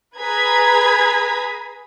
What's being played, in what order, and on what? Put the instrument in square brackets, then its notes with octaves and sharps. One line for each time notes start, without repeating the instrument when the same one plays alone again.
[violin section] G#4 B4 A#5 G#6 B6